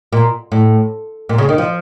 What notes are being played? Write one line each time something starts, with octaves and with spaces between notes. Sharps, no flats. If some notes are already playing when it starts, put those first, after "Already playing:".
A#2
A2
A#2
C#3
D#3
F3